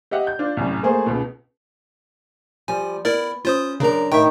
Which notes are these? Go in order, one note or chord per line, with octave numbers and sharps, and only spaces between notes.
G4 D#5 E5 F#5
G6
D4 F4
C2 F#2 A2
A3 A#3 G#4 C5
C#2 G#2 B2
F3 G3 G#5
B3 E4 A#4 D5
C#4 F4 C5 D#6
F#2 C#3 D4 A#4 A#5
A2 D#3 E5 G5